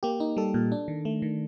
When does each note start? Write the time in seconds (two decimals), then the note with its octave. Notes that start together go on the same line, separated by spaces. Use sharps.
0.03 A#3 G4
0.20 D#4
0.37 G3 A4
0.54 A#2
0.72 D4
0.88 D#3
1.05 A3
1.22 D#3